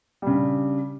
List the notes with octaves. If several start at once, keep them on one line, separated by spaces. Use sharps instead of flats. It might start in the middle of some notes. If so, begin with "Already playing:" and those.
C#3 G3 D4